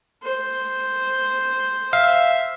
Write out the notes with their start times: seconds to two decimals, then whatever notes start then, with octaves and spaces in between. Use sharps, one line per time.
0.23 C5
1.93 E5 F5